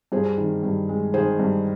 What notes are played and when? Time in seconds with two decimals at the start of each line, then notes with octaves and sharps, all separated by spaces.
0.12 G2 G#4 C5
0.37 D#3
0.63 G2
0.89 G#3
1.14 D#3 G#4 C5
1.39 G2